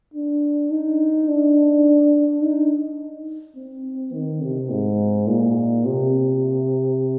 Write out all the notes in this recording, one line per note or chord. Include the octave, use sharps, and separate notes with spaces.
D4
D#4
D4
D#4
C4
D#3
C3
G#2
A#2
C3